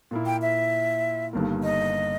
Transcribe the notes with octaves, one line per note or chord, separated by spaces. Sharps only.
A#2 A#3 E4
G5
E5
G1 G2 D#3 A#3
D#5